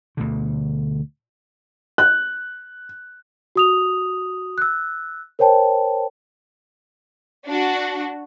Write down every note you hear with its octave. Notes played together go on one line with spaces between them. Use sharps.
D2 B2 D3
F#6
F#4 D#6 F7
E6 F#6
A#4 C5 C#5 G5 A5
D4 F#4